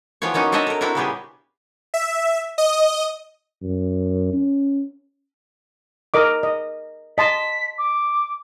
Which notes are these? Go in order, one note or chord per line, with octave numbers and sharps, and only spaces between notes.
E3 F3 B3 F#4 C#5
A#3 B3 C#4 D#4 F#4
C4 D4 C#5 D#5 E5 A5
A4 A#4
C4 D4 E4 F#4 A#4
A#2 C#3 G3 B3 G4 G#4
E5
D#5
F#2
C#4
A#4 D#5 D6
D#5
D#5 A5 C6 B6
D6